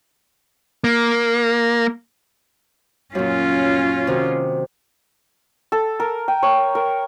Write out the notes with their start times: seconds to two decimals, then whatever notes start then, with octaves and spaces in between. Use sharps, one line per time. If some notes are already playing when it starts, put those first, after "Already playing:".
0.84 A#3
3.15 F#2 A#2 C#4 F4
4.07 C3 D#3 F#4
5.72 A4
6.00 A#4
6.28 G5
6.43 C#5
6.75 A#4